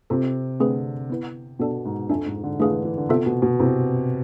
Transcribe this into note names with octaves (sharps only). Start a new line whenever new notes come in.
C3 C4 F4 A4
D3 A3 C4 G#4 B4
B3 E4 B4
B2 B3 D4 A4 D5 A5
G#2
F2 D4 A4 E5 G#5
G#2
D3
E3 A3 D4 G#4 B4 F5
E3
E3
D3
C3 B3 F4 A4 E5
B2
B2
C3 C4 E4 G#4 B4